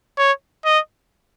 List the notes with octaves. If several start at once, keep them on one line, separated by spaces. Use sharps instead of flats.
C#5
D#5